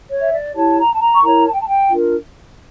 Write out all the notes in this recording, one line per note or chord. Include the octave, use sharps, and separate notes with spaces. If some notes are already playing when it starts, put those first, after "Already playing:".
C#5
E5
D5
E4 G4 C#5 A5
A#5
A5
A#5
C#6
E4 A#4 C#5 A#5
A5
G5
A5
G5
D4 F4 A#4